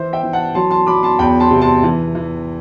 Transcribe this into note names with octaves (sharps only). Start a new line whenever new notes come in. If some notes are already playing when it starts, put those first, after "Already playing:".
Already playing: E3 C5 E5
E5 G5
E3
F#5 A5
F#3 A5 C6
A5 C6
F#3 B5 D6
A5 C6
E2 G5 B5
A5 C6
C3
A5 C6
E3
E3